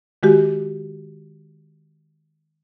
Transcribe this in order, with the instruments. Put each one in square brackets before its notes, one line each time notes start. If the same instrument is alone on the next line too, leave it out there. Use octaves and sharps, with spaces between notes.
[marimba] D#3 G#3 F#4 G4